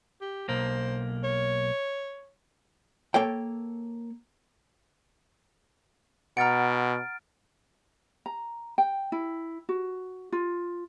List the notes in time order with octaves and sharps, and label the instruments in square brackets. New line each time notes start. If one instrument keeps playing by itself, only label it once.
[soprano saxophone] G4
[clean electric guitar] B1 A#3 [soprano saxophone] C5
[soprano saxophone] C#5
[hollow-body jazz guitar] A#3 A4 C#5 G5
[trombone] B2 [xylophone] F#5 A#5 [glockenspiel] F6 A6 D7
[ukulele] A#5
G5
E4
F#4
F4